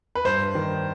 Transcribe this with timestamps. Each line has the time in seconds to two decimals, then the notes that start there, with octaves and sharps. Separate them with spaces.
0.15 B4
0.25 G2 C5
0.55 D#3